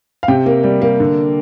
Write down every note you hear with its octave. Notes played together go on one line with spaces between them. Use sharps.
F5
C3 G5
A#3
G3
A#3
D3